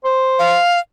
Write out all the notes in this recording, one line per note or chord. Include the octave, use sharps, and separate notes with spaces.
C5
F5